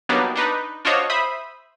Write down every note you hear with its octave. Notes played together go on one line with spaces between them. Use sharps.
F#3 G3 A#3 B3 D4 D#4
D4 D#4 B4
D4 F4 F#4 C5 C#5 D#5
C5 E5 B5 D#6